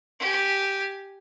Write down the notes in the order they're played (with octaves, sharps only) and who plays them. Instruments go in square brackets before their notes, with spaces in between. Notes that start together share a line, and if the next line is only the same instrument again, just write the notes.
[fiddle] G4 G#5